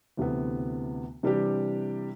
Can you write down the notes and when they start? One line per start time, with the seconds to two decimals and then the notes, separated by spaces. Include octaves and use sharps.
0.17 D2 C3 E3 B3
1.23 C3 E3 G3 D4 G4